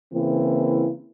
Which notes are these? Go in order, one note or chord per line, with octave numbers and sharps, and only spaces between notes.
C#3 E3 A#3 C4 E4